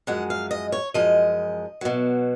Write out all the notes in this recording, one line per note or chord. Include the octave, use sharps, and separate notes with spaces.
F#2 F3 G#3 F#5
F5
D#5
C#5
F#2 F3 G#3 D#5
B2 F#3